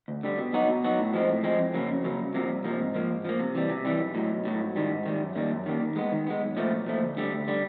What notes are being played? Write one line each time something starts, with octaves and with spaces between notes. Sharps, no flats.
D2
D3 G3
B2
F#3 B3 D#4 F#4
B2
F#3 B3 D#4 F#4
A2
F3 G#3 C4
A2
F3 G#3 C4
F2
C#3 F#3 A#3
F2
C#3 F#3 A#3
C2
C3 F3 A#3
C2
C3 F3 A#3
G#2
F3 A#3
G#2
F3 A#3
C3
E3 G3
C3
E3 G3
B1
A2 F#3
B1
A2 F#3
G#2
D#3 G3
G#2
D#3 G3
F#2
D#3 G3 A#3
F#2
D#3 G3 A#3
D#3
G#3 B3
D#3
G#3 B3
B1
A#2 F3 A3
B1
A#2 F3 A3
D2
D3 G3
D2
D3 G3